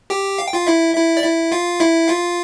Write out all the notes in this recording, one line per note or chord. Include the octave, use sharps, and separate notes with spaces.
G4 G5
F5
G5
F4 F5
E4 E5
E4 E5
D5
E4 E5
F4 F5
E4 E5
F4 F5